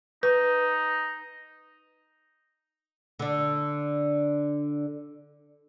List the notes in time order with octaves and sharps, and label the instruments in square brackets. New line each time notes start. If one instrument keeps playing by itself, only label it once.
[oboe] D#4 [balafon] B4
[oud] D3 D4